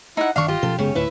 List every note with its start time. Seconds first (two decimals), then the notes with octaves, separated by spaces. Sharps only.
0.17 D#4 E4 F#5
0.36 G1 D#3 D4 F5 C#6
0.48 F4 G4 D#5
0.63 B2 F3 C#4 A4
0.79 F#1 C#3 G#3 B3 C#4
0.95 D2 A2 E4 B4 E5